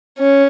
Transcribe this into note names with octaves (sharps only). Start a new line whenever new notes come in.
C#4